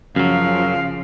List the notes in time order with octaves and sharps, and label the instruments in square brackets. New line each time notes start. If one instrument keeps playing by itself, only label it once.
[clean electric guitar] F#2 F#3 [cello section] C#3 F3 [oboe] F5